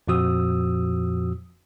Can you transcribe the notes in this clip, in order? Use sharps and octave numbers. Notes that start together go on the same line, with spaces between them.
F2 A#2 F3 F#4 D#6 E6